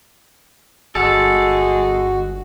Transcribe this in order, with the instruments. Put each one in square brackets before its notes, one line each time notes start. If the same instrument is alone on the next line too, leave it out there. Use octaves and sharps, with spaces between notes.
[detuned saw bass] G1 [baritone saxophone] G#3 [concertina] F#4 [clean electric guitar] A4